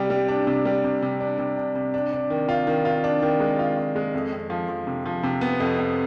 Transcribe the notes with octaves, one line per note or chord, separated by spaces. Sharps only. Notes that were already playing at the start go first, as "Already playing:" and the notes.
Already playing: C3 G3
G3
D4
C3
G3
C3
C3
D4
C3
D4
C3
D4
D4
D#3
F4
D#3
F4
D4
D#3
G#3
F4
F4
G#3
F2
F2
F3
F3
C3
F3
C3
B3
F2
F2